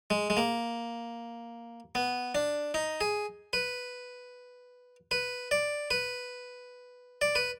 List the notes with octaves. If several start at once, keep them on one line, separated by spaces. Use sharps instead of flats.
G#3
G#3
A#3
B3
D4
D#4
G#4
B4
B4
D5
B4
D5
B4